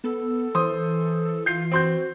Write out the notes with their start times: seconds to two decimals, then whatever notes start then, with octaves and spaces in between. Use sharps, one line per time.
0.04 B3 A4
0.55 E3 C5 C6 D#6
1.46 F4 G6 C7
1.72 C4 F#4 C6 G6